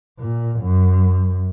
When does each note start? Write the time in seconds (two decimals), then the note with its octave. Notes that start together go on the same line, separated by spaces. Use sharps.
0.19 A#2
0.60 F#2